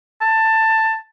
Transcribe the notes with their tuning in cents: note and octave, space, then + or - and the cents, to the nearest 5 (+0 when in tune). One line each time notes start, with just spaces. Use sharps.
A5 +15